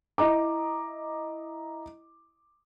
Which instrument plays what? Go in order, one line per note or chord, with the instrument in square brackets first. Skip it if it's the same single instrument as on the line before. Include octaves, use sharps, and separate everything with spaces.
[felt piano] E4 D#5 A#5 D6